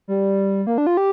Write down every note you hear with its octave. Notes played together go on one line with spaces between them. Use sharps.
G3
A#3
D4
F4
G4